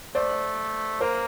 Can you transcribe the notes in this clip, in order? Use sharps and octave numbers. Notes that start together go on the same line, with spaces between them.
A3 C5 D5
A#3 A#4 C5